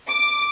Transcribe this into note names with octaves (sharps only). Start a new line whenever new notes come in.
D6